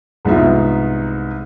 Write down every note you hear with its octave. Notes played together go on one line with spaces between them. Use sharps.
C2 G#2 B3 D#4 F4 E5